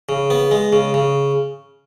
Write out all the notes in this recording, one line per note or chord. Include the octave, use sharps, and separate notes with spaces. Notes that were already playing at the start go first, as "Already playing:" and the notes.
C#3
B3
G#3
C#3
C#3